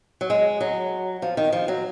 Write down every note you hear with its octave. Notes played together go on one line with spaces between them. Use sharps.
F#3
G#3
F#3
F3
D#3
F3
F#3